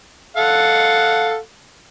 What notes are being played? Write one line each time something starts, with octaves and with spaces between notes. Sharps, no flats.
A4 F5 F#5